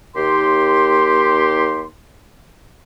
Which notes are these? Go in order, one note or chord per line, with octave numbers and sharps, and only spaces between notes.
D#2 G4 C6